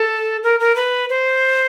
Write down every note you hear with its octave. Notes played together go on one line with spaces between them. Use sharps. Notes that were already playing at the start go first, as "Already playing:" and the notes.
Already playing: A4
A#4
A#4
B4
C5